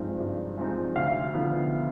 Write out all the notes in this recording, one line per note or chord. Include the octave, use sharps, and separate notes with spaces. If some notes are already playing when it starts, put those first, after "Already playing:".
Already playing: G2 F3 G#3 C4 D#4
G2
F3 G#3 C4 D#4
D2 F5
D3 F3 B3 D#4